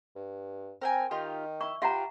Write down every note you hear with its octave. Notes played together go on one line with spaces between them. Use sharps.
G2
C4 A#4 G5 G#5
D#3 D#4 F4 G4
E4 C#6
F4 G4 B4 E5 F#5 G5 A#5